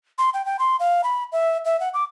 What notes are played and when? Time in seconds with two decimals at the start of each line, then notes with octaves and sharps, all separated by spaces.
0.18 C6
0.34 G5
0.46 G5
0.59 C6
0.80 F5
1.04 B5
1.32 E5
1.65 E5
1.80 F#5
1.94 D6